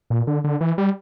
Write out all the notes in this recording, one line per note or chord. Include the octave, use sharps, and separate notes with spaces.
A#2
D3
D3
E3
G3